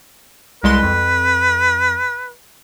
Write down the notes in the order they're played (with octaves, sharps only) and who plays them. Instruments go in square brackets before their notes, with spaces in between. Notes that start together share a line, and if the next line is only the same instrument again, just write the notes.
[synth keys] C2 G#3 C6 [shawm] B4
[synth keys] F2